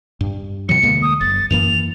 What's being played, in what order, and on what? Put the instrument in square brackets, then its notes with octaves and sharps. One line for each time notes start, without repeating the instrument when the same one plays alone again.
[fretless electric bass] G2
[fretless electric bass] B2 E3 F#3 [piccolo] C#7
[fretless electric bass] D2 G#3 A#3
[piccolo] D#6
[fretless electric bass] F#1 [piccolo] A6
[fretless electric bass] F#2 E3 A#3 [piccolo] F7